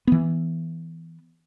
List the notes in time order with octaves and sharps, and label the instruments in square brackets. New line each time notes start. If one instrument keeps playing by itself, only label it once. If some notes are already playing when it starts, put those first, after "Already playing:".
[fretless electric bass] E3 B3